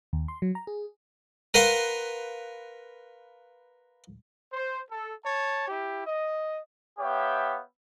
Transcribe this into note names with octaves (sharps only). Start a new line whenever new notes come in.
D#2
C6
F#3
A#5
G#4
A#4 B4 F5 F#5 C6
C5
A4
C#5 A5
E4 G4
D#5
B3 G4 C#5 E5 F5 G5